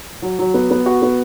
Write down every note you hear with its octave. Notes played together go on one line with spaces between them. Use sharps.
F#3
F#3
B3
B3
F#4
B3